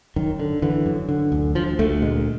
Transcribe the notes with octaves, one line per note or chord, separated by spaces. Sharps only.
F#2 D#3
D3
D3 E3
F#2
D3
D2
D2 F3
D2 A3
A#2 G#3